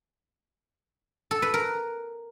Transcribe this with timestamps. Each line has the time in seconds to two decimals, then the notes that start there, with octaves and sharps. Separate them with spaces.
1.31 A4
1.42 B4
1.54 A#4